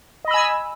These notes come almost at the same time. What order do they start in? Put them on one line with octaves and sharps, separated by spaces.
D#5 B5 E6 G#5